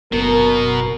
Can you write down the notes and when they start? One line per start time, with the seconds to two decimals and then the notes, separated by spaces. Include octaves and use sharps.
0.12 F#1 B2 A#4